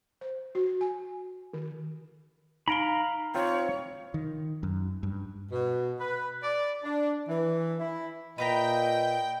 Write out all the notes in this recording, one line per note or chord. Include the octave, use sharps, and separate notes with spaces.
C5
F#4
G#5
D#3
D#4 F5 A#5 B5 D7 G7
C4 F4 C5 C#5
D#3
F#2
G2
B2
B4
D5
D4
E3
E4
A#2 B4 D#5 E5 G5 A#5